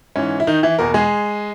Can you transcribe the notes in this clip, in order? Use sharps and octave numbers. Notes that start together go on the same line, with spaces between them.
G#2 E3 C#4
E4
D#3 D#4
E3 E4
E2 B2 A#3 A#4
G#3 G#4